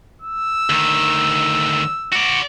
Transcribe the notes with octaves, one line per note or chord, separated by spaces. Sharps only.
E6
D2 D#3
F#4 D5